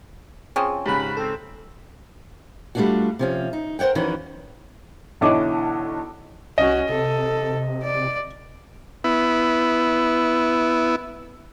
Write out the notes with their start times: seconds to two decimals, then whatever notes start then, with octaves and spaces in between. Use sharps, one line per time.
0.56 F3 C4 C#4 G#4
0.86 G#2 C#3 G4 G#4 B5 F#6
1.17 C4 A4
2.75 G3 A3 A#3 D4 F4 F#4
3.19 C3 F3 C#4
3.53 D#4
3.79 A#4 C5 C#5 F#5 G5
3.95 F2 D#3 E3 C#4 F#4
5.21 B1 D3 E3 C#5 D#5 D6
6.58 C2 C#4 F#4 D#5
6.89 C3 A4
7.84 D5
9.04 B3 E4